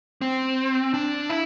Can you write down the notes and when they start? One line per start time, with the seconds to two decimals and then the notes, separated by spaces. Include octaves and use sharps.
0.21 C4
0.94 D4
1.29 E4